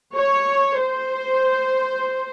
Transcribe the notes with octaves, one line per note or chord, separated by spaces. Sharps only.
C#5
C5